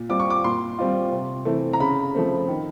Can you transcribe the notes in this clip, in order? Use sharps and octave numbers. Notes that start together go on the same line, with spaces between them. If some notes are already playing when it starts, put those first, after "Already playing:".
Already playing: A#2
G3 C4 F4 D6
C#6
D6
A#2 C6
G3 C4 F4
C3
E3 A3 C4
A#5
C#3 B5
F3 A3 C4
D#3